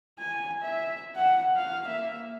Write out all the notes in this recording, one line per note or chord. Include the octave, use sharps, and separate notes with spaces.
G#5
E5
F#5
F5
A#3 E5